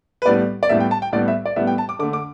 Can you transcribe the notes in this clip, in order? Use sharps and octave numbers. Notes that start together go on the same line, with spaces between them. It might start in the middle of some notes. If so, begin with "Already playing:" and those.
B4
A2 G3 B3 D5
D5
A2 G3 B3 E5
G5
A5
G5
A2 G3 B3 D5
E5
D5
A2 G3 B3 E5
G5
A5
D6
D3 A3 D6
D6